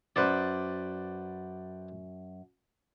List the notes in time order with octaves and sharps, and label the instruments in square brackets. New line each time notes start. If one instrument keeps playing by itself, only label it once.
[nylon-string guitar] F#2 [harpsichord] B4 C5 D5